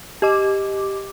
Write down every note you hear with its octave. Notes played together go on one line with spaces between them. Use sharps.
G4 D#5 D6